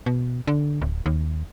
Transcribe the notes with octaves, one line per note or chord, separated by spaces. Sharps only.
B2
D3
D1
D#2